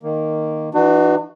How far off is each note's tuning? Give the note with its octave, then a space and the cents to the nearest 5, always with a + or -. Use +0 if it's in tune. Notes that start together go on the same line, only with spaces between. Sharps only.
D#3 -5 A#3 +0
E3 +0 D4 +45 F#4 +5